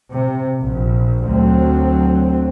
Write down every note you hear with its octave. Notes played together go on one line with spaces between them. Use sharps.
C3
A#1
D2 F#3 C4